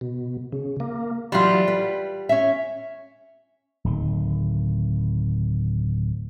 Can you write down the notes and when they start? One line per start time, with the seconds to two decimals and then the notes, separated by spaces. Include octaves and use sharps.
0.01 B2
0.52 C#3
0.80 A#3
1.32 E3 F#3 G3 F4
1.68 B4
2.29 C#4 E5
3.85 D1 D#3